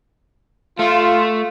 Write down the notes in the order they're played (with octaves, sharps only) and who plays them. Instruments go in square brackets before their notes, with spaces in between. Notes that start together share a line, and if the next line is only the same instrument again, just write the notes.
[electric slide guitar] A3 [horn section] F4